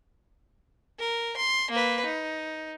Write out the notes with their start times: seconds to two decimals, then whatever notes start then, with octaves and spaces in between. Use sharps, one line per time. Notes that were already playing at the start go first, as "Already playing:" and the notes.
0.99 A#4
1.37 C6
1.70 A#3 B4
2.05 D#4